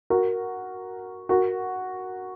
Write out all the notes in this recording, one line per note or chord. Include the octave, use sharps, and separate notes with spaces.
F#4 A#4
F#4 A#4